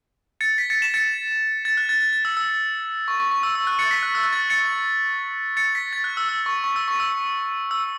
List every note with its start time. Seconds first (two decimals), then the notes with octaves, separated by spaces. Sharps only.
0.41 A6 C#7
0.58 B6
0.70 A6 C#7
0.82 B6 E7
0.94 A6 C#7
1.65 A6
1.77 F#6
1.89 A6
2.00 A6
2.13 A6
2.25 E6
2.37 E6
3.08 C#6
3.20 C#6
3.31 C#6
3.43 E6
3.55 E6
3.67 F#6
3.79 A6 C#7
3.91 B6
4.03 F#6
4.15 E6
4.23 F#6
4.33 A6
4.50 A6 C#7
5.57 A6 C#7
5.75 B6
5.93 A6
6.04 F#6
6.17 E6
6.29 E6
6.46 C#6
6.64 C#6
6.76 E6
6.88 C#6
7.00 E6
7.71 E6